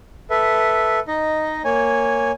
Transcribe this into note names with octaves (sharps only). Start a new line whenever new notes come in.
A4 B4 E5
D#4 D#5
A#3 C#5 G#5